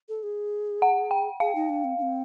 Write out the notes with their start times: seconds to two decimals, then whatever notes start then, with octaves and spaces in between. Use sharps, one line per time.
0.09 A4
0.23 G#4
0.82 F#5
1.11 G5
1.40 G#4 F5
1.55 D#4
1.69 D4
1.84 C4
1.98 D4
2.02 C4